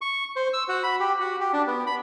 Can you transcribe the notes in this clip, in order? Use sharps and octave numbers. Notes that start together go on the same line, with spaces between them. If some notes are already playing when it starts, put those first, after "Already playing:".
C#6
C5
E6
F#4
B5
G4
F#4
G4
D4
B3
B5